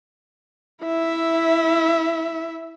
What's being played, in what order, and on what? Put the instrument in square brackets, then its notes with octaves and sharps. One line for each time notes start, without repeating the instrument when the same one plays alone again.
[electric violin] E4 E5